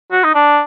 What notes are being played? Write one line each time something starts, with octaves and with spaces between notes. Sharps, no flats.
F#4
D#4
D4